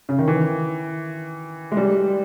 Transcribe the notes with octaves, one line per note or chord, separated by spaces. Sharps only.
C#3
D#3
E3
G#3
G3